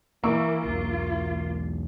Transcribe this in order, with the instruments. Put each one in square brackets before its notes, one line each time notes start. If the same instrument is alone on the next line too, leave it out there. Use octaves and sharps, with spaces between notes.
[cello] E3 [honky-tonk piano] A#3 C#6 E6
[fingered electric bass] B1 E2 [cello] F4